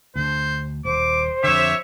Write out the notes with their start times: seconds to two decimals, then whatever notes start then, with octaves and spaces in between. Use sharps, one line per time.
0.16 D2 D3 C5
0.85 D#1 C5 D6
1.44 F2 D3 G4 C#5 E5